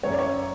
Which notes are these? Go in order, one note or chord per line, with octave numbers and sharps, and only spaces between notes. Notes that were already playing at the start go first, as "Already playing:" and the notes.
F#2 C#5
D5
C#5